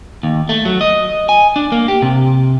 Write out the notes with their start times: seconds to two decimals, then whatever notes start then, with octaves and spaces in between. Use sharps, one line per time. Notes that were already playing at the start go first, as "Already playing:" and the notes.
0.23 D#2
0.49 A3
0.65 F#3
0.81 D#5
1.29 G#5
1.56 D4
1.72 A#3
1.88 G4
2.02 C3